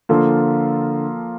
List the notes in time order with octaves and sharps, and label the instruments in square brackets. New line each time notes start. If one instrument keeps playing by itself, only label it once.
[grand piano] D3 [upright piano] F3 A#3 F4 A4